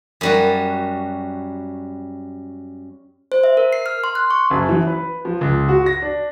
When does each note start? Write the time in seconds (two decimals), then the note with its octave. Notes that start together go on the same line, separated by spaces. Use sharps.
0.21 F#2 G3 F#4
3.32 C5
3.44 E5
3.57 A#4
3.73 C7
3.86 F6
4.04 C6
4.15 F#6
4.31 C#6
4.51 F#1
4.69 E3
4.87 B4
5.25 F3
5.41 C#2
5.69 F#4
5.86 A#6
6.02 D4